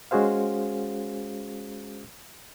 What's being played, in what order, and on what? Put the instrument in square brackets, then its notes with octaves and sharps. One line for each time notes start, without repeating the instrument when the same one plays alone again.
[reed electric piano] G#3 C#4 F#4 G#4 C5 F5